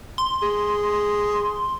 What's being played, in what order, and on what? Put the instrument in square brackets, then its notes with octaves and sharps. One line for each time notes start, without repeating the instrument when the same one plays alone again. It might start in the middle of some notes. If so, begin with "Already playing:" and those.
[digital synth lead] C6
[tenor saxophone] G#4